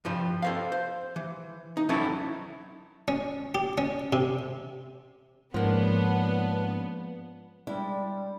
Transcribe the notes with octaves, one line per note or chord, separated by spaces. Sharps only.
G2 F3 G3
A4 C5 F5
C5
E3
D#4
E3 F#3 C#4 D#4 E4 A4
C#4
G4
C#4
C3
G#2 C#3 F3 A#3 B3 D4 F#5
G3 G#3 D4 E4